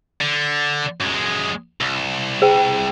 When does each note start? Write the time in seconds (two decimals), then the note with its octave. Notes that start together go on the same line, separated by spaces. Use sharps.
0.21 D3
1.00 F#2 G#3
1.81 C2
2.42 G#4 G5